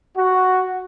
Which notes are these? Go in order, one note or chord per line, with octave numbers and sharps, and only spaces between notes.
F#4